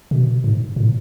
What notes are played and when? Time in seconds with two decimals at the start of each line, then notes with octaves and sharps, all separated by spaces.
0.11 B2
0.44 G#2
0.76 A2